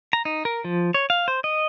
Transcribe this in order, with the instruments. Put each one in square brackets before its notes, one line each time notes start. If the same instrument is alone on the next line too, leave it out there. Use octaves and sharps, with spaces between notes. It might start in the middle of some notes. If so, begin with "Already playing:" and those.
[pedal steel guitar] A#5
D#4
A#4
F3
C#5
F5
C5
D#5